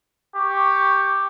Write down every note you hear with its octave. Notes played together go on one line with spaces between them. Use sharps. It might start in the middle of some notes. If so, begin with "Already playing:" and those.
G4 C#6